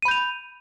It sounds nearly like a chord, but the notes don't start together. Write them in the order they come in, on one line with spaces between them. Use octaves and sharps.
D#7 B5 G6 F7